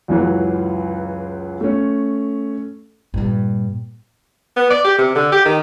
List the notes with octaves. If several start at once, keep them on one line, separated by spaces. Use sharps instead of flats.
C#2 F#2 E3 F#3
A3 C#4
G2 A#2
B3
D5
G4
C3
D3
G4
D#3